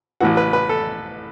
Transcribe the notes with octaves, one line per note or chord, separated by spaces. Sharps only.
A1 A2 E3 F#4
B4
B4
A4